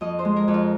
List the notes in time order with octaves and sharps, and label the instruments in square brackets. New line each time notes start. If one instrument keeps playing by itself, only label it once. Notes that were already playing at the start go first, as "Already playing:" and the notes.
[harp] F2 D#5
C5
G#3
A#4
F2
F4